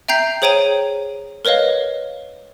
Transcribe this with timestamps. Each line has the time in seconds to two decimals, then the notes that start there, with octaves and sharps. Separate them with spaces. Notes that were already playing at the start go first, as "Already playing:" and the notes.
0.08 E5 G5 A#5 G6 C7
0.42 G#4 C5 C#5 G5 A#5 D#7
1.45 A#4 B4 C#5 D#5 F5